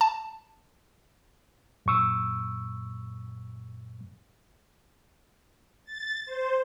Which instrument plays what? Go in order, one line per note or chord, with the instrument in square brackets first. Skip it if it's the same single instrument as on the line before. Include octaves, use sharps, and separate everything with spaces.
[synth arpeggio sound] A5
[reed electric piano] F#2 A#2 C#6 E6
[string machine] A6
C5